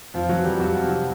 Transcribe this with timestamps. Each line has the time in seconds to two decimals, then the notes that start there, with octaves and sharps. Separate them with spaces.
0.14 F2 F3 F4
0.29 F#3 F#4
0.37 E3
0.45 G3 G4
0.60 F2 F#4
0.74 G4
0.83 C3
0.89 F#3 F#4